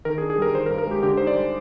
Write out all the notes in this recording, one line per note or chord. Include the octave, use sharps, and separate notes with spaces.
D#3 A#4
G#4
D4
G#4
G3 A#4
D#3 C5
A#4
G2
A#4
G#3 G4
D3 G4
D#4 C5
D5
G3